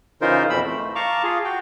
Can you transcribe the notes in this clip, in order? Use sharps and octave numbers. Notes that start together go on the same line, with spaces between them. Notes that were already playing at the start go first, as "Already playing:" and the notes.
C#3 E3 D#4 F4 A#4 C5
F2 B2 E3 B5 E6
A3
F5 A5 A#5 C#6 D6
F4 G#4
F#4 G5